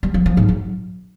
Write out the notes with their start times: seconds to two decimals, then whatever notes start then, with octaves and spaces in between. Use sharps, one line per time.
0.03 G3
0.14 F3
0.26 F3
0.37 G#2
0.49 F#3